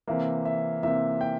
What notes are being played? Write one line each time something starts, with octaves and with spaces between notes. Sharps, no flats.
C3 E3 A#3 E5
E5
C3 E3 A#3 E5
G5